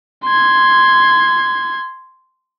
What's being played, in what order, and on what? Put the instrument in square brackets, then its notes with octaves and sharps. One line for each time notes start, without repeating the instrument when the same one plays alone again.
[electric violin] C6 G#6